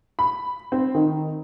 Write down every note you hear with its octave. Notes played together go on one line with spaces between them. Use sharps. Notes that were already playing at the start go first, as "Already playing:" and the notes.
B5
C4
D#3